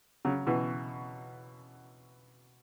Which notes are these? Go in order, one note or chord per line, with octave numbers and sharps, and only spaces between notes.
C#3 F#3
B2 E3